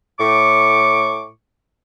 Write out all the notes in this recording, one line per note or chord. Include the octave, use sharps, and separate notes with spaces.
A2 C#6 D6